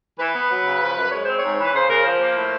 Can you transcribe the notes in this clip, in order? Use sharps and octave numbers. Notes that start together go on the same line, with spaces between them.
E3 B4
B3
F#3
C#3
F3
F#2
G#3 C#5
C4 C5
C#5
G#2
E3
B4
C#3 C5
C#3 A#4
F3 C5
A#3
A2